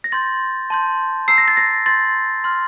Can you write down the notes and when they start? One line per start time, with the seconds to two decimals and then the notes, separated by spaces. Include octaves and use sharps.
0.04 A#6
0.12 C6 G6 A6
0.70 A5 C6 G6
1.28 A#5 E6 G6 C7
1.38 A#6
1.48 A6
1.57 A#6
1.86 C6 G6 A6
2.44 C6 F6